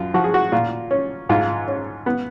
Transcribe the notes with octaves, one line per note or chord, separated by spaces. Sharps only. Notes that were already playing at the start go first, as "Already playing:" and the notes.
Already playing: F#2 F4
F3 F#4
G#4
F#4
A#2 F4
C#4
G#2 F4
C#4
B3